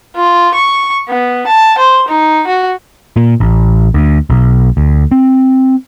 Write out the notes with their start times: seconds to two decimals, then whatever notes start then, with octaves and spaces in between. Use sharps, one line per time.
0.16 F4
0.54 C#6
1.09 B3
1.47 A5
1.78 C5
2.08 D#4
2.47 F#4
3.16 A#2
3.40 A1
3.94 D2
4.30 B1
4.77 D2
5.11 C4